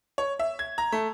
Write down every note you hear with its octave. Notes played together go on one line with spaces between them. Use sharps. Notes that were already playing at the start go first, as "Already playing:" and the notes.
C#5
E5
G#6
A#5
A3